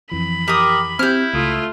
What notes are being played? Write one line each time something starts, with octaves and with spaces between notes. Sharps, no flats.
F2 E3 B5
G4 A#4 D#6
C4 E4 G4 F6 G6
C#2 A3 F4 D#6